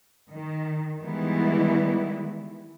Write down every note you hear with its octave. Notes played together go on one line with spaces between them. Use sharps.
D#3
D#3 E3 G3 G#3 B3 E4